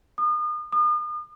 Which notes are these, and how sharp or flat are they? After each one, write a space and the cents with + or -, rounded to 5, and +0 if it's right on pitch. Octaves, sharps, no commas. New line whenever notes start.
D#6 -35
D#6 -40